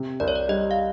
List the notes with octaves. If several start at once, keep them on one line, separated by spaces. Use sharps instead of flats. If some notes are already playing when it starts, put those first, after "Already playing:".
Already playing: C3
C2 D5
C#5
D5
G3 D#5
F5